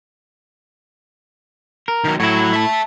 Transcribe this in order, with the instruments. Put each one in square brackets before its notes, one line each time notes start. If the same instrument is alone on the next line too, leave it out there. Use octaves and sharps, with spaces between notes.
[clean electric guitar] A#4
[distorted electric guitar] D#3 F#3
[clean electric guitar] A2 E4 [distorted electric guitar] F#3 C#5
[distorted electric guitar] E5 A5